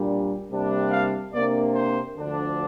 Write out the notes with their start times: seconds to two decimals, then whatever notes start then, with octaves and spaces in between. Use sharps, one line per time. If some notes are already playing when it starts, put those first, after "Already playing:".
Already playing: A#2 G3 D4
0.49 C3 G3 A#3 D4
0.91 F5
1.33 C3 A#3 D4 D5
1.74 C5
2.17 D2 D3 F3 D4